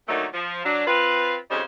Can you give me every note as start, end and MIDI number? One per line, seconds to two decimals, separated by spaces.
0.08 0.26 46
0.08 0.26 50
0.08 0.26 51
0.08 0.26 54
0.08 0.26 57
0.08 0.26 63
0.33 0.65 53
0.65 0.82 54
0.65 0.82 62
0.87 1.36 60
0.87 1.36 65
0.87 1.36 71
1.51 1.61 41
1.51 1.61 49
1.51 1.61 55
1.51 1.61 61
1.51 1.61 63
1.51 1.61 72